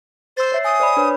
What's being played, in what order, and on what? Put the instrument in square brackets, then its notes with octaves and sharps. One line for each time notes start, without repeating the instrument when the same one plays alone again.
[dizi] C5 [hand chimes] E6 A6
[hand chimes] C#5 E5 C7
[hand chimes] G#5 [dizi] D#6
[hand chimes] C5 D5 B5
D4 B4 C#5